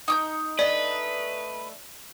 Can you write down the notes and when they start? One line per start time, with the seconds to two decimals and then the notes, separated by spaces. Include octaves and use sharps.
0.08 D#4 D6 G6
0.59 A3 D4 B4 D5 D#5